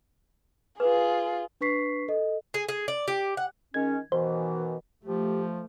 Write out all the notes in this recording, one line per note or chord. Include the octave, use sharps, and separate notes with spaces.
F4 G#4 B4
D4 B4 C#6 B6 C7
A4 D#5
G#4
G#4
D5
G4
F#5
D#3 G#3 C#4 G#6
B2 D#3 E3 C5
F3 A3 G4